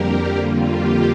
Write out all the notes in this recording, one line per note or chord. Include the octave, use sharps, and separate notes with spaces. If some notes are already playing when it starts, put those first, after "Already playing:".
Already playing: F2 D3 G3 A#3 G4 A#4
F2 D3 G3 A#3 F4
G4